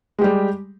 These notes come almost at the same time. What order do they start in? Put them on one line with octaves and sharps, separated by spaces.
G#3 G4 G3